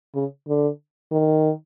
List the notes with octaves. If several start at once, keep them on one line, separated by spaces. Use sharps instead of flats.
C#3
D3
D#3